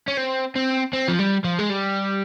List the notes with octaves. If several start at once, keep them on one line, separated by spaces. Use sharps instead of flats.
C#4
C4
C4
C4
F3
G3
F3
G#3
G3